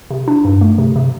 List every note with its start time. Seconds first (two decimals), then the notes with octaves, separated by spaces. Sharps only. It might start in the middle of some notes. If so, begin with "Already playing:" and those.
0.10 C3
0.28 D4
0.45 G2
0.61 A3
0.78 C3
0.96 C3